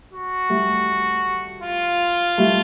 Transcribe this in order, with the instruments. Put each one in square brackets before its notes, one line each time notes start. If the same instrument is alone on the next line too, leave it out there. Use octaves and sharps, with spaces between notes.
[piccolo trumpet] F#4
[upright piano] G3 A3
[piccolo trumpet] F4
[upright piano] G3 A3